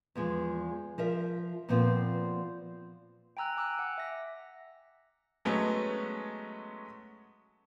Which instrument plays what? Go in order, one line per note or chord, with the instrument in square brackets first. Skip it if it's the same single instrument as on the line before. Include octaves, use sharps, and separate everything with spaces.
[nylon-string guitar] E2 F3 G#3
F3 A#4 E5
A#2 F3 B3 C4
[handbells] G5 G#5 A#5 E6 F#6
G#5 D6 E6 F#6
F#5
E5 A#6
[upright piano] F#3 G#3 A3 B3 C#4